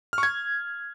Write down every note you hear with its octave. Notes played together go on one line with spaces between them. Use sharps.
F6
C#6
G#6